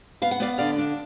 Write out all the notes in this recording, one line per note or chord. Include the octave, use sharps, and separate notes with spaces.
B3 F5
F#5
B3 D5 F5
D3 D5 F5
D4